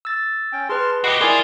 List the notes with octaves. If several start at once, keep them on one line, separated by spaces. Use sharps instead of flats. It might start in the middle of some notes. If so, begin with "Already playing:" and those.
E6 A6
C#4 G5
G#4 B4 A5 C6 F6
F#4 G4 B4 D#5 C7 D7
E4 F4 G#4 A#4 C5 D5